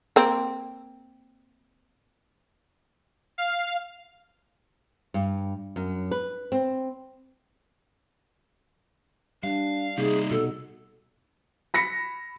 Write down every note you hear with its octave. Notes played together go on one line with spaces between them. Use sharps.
A#3 C4
F5
G2
F#2
B4
C4
G3 D4 F5
C3 G3 A#3 D#4 G#4
B2 F#4 A4
B5 A#6 B6 C#7